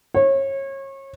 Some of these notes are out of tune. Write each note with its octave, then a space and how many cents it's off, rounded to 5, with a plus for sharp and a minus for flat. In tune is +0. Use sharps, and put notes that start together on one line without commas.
C#5 -30